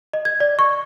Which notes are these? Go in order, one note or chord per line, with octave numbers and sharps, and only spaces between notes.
D#5
G#6
D5
C#6